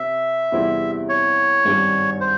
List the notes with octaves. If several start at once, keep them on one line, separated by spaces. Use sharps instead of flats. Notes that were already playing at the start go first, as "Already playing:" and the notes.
Already playing: C3 C4 E5
E2 C3 G3 C4 E4
C#5
G#1 G2 G3 C#4
C5